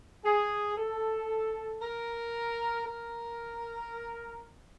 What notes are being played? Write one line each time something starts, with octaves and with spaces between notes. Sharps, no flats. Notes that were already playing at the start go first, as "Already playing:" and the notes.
G#4
A4
A#4
A#4